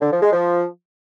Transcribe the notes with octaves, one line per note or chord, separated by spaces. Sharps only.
D3
F3
G#3
F3